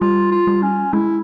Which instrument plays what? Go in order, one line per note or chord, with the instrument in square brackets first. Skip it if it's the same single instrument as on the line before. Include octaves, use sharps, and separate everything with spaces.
[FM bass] G3 [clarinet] F4
[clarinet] F4
[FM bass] G3
[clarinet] C#4
[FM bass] G#3 [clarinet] E4